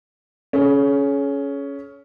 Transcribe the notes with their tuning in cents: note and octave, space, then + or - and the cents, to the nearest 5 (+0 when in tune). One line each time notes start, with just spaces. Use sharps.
C#4 +10 G#4 +45